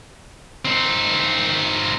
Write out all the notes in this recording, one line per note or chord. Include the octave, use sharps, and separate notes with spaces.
C4 D#4